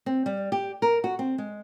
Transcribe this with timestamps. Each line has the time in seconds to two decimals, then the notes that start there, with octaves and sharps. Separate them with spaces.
0.06 C4
0.26 G3
0.52 G4
0.82 A#4
1.04 F#4
1.19 C4
1.38 G#3